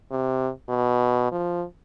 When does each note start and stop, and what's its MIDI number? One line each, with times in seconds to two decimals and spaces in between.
0.11 0.50 48
0.69 1.29 47
1.32 1.64 53